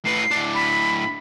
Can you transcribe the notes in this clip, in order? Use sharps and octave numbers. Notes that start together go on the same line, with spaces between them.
A2 B4 C7
A2 D4
B5